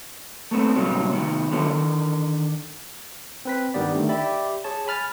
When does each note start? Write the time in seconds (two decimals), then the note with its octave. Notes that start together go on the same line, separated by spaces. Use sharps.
0.51 A3 B3 C4
0.76 A#2 C#3 F#3 G3 B3
1.12 C3 D#3 B3
1.51 D3 D#3 F#3 B3 F4
1.65 D3 D#3
3.45 C4 B4 B6
3.74 G2 D#3 G3 B3 D5
3.95 D3 D#3 A3
4.09 G4 D5 E5 B5
4.64 G#4 C#5 A5
4.87 G#5 B5 F6 A6